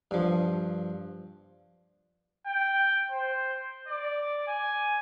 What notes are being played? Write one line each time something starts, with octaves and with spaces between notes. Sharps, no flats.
G2 F3
G5
C5
D5
G#5